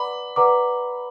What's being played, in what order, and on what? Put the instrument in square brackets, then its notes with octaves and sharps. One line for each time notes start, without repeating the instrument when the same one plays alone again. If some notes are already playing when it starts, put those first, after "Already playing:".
Already playing: [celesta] B4 D5 F#5 A#5 D6 [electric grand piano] B5
[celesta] B4 D5 F#5 A#5 D6